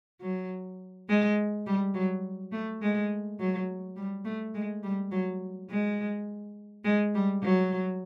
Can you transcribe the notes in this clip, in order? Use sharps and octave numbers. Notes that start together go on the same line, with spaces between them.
F#3
G#3
G3
F#3
A3
G#3
F#3
G3
A3
G#3
G3
F#3
G#3
G#3
G3
F#3